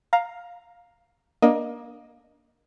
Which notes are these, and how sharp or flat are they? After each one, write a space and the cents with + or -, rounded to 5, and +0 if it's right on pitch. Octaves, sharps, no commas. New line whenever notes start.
F5 +10 A#5 +0
A#3 +25 D4 +0 D#5 +0